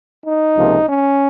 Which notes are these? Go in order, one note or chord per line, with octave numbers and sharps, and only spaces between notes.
D#4
C#2 C3 F3 A#3
C#4